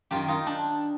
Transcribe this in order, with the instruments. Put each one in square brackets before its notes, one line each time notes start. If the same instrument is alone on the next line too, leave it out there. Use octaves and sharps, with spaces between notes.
[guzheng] F#2 D#3 F4 G4
D#4 F4
D4